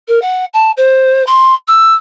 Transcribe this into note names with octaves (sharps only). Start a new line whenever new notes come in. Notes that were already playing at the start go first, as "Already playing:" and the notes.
A#4
F#5
A5
C5
C6
E6